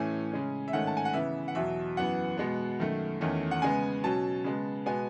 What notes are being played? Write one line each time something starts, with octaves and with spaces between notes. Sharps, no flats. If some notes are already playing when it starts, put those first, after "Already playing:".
Already playing: A2 E3 A3 C#4 G#5
C#3 G#3 C#4
E5
G#2 D#3 A3 C#4 F#5
A5
G#5
F#5
C#3 E3 B3 E5
F#5
E2 B2 F#3 E5
F#2 E3 B3 F#5
B2 G#3 B3
F#2 D#3 A3
E2 D#3 A3 C#4
F#5
C#3 G#3 B3 G#5
B2 F#3 C#4 A5
C#3 G#3 B3
B2 G#3 B3 G#5